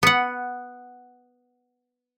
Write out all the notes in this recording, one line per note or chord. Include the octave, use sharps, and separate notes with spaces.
B3 F#5